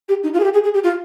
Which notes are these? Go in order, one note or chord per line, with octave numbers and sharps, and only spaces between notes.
G4
D#4
F4
G#4
G4
G#4
G#4
G4
F4